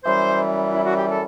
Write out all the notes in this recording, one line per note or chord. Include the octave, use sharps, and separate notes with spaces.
F#2 E3 G3 C5
E4
F#4
G4
A4